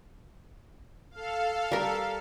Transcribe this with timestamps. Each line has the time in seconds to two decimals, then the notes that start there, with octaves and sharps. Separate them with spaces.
1.11 A4 F5
1.71 G3 A#4